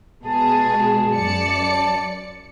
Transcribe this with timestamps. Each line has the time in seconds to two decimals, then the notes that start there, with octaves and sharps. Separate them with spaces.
0.24 B2 G#3 G#4 A5
1.13 F#2 D5 C#7